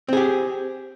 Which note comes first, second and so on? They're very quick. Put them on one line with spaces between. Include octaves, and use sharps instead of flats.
C4 G#4 G4